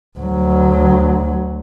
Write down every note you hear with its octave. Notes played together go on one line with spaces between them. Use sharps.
D2 F#3